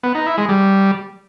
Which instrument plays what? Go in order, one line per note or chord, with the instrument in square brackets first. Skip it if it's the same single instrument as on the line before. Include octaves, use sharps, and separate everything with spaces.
[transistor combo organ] B3
D#4
E4
G#3
G3